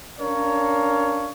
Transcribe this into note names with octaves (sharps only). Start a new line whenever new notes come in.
C#4 D4 A#4 C#5 F5